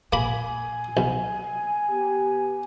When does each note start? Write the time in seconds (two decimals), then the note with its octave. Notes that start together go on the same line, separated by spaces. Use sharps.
0.13 A#2 A#3 G#5 B5
0.97 B1
1.90 B3 G4